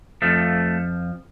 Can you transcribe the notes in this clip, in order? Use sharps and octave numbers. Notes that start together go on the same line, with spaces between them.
F2 F3 A3